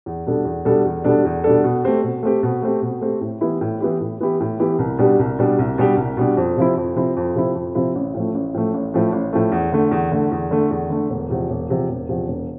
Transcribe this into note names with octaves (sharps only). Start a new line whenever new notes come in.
E2
B2 G3 D4 A4
E2
B2 G3 D4 A4
E2
B2 G3 D4 A4
E2
B2 G3 D4 A4
B2
A3 C4 G4
B2
A3 C4 G4
B2
A3 C4 G4
B2
A3 C4 G4
A2
E3 B3 E4 G4
A2
E3 B3 E4 G4
A2
E3 B3 E4 G4
A2
E3 B3 E4 G4
C2
B2 G3 D4 G4
C2
B2 G3 D4 G4
C2
B2 G3 D4 G4
C2
B2 G3 D4 G4
F2
C3 F3 C4 E4
F2
C3 F3 C4 E4
F2
C3 F3 C4 E4
F2
C3 F3 C4 E4
A1
A2 F3 A3
A1
A2 F3 A3
A1
A2 F3 A3
A1
A2 F3 A3
E2
D3 A3
E2
D3 A3
E2
D3 A3
E2
D3 A3
E1
E2 C3 F3
E1
E2 C3 F3
E1
E2 C3 F3
E1